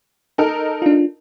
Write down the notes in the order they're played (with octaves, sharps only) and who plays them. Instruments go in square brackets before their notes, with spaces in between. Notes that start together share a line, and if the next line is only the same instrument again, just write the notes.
[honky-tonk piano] D#4 A4 A#4
[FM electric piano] D4 F4